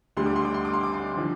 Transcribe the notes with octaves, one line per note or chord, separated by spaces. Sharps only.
D2 D3 G3 C6
D6
C6
D6
C6
D6
C6
D6
C6
D3 F3